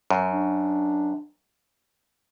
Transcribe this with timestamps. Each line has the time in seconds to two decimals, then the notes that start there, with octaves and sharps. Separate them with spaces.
0.10 F#2
0.31 D4